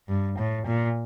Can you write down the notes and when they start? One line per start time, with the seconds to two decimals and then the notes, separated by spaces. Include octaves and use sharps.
0.08 G2
0.38 A2
0.66 A#2